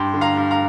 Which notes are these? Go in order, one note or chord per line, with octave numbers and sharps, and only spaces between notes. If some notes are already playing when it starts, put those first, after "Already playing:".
Already playing: G2 G5 C6
D3
F5 A#5
G2
F5 A#5